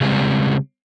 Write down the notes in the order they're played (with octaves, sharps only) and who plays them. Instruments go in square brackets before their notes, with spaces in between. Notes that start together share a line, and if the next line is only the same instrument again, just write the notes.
[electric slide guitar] C#3 G3 G#3 C4